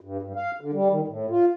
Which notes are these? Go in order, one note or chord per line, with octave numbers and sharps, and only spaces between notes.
G2
G2
F5
D3
G3
D#3
A2
F4